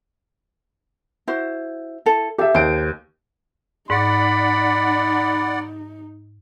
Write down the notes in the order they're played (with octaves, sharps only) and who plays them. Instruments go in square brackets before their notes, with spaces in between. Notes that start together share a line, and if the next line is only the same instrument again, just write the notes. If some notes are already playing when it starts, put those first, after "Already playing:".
[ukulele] E4 F#4 C5
E4 A4
[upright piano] G4 E5 [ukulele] A4 F5
[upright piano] D#2 D7 [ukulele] C5
[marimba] G#2 [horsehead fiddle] D#4 [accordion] D5 F#5 [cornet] B5